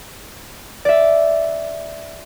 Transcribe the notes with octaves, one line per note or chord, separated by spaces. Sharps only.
D5 E5